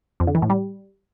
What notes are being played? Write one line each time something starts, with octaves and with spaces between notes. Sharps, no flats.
F2
D3
E3
A2
G3